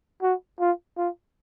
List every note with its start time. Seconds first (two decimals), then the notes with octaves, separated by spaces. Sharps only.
0.23 F#4
0.60 F4
0.98 F4